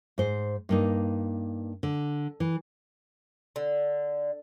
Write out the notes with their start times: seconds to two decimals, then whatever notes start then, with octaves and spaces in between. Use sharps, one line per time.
0.18 G#2 C5
0.69 G2 A#3 D#4
1.83 D3
2.40 E3
3.56 D3